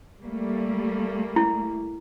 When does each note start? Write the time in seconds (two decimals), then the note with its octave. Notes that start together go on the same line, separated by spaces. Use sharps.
0.21 G3 A3 A#3
1.36 E4